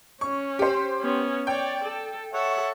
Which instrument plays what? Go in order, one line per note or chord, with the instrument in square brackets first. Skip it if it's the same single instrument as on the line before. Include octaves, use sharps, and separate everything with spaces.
[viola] C#4 [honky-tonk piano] C#6
[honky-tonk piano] G4 C5
[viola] B3 C#4
[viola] C#5 D5 [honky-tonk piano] G5
[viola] A4
[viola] A4 [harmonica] C#5 E5 F#5